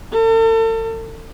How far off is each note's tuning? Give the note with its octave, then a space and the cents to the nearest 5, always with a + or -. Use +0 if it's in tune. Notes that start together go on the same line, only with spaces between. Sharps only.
A4 +40